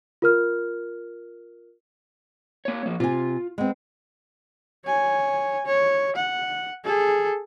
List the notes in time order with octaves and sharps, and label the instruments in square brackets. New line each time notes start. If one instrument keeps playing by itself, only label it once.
[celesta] F4 A#4 F6
[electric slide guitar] A#3 C#5
F3 A#3
[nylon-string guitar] C3 G#5 [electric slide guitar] F4
[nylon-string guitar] G#3 B3 C4
[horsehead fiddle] C#5 G#5
C#5
F#5
G#4 A4